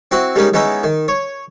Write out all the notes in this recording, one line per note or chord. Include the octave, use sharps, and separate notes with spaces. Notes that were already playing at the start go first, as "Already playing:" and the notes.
C4 E4 F#4
G3 G#3 A#3 C#4 D#4
G#3 B3 C#4 D#4 E4
D#3
C#5